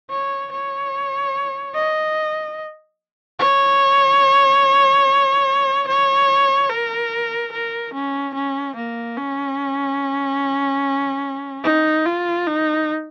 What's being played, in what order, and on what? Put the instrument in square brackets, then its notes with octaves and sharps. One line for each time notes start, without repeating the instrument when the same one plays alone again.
[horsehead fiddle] C#5
C#5
D#5
C#5
C#5
A#4
A#4
C#4
C#4
A#3
C#4
D#4
F4
D#4